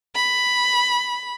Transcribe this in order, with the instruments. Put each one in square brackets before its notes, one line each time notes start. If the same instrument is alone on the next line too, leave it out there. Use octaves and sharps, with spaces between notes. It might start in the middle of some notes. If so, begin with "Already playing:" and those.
[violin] B5